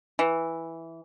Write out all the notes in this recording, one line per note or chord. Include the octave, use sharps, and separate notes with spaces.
E3